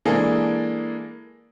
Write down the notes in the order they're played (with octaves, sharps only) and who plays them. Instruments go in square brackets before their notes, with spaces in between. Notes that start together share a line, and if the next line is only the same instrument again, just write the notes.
[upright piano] E3 G#3 A#3 D4 G#4 A4